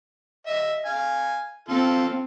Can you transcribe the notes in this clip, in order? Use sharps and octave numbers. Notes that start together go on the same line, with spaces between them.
D#5 E5
F5 G#5
C4 F4 A4